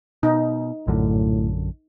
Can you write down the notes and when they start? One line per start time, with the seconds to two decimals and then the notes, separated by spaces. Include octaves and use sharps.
0.23 B2 D#4
0.87 A#1 F#2 A2 D3